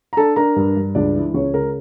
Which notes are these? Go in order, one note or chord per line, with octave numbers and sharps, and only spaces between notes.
A#5
D4 A4 A5
D4 A#4 A#5
G2
G2
C#2 D4 D5
E3
C#2 C#4 C#5
C#3 A#4